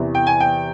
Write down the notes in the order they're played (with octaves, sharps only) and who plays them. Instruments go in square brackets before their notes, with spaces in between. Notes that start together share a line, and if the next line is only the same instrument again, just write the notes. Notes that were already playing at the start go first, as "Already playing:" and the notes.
Already playing: [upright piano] E2 C3 E3
G5
G#5
G5